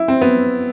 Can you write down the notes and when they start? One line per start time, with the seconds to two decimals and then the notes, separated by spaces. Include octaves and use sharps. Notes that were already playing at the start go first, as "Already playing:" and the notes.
Already playing: E4
0.08 C4
0.21 B3